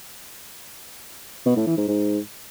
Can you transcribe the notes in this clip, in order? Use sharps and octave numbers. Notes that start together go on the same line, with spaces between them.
B2
A2
E3
G#2
G#2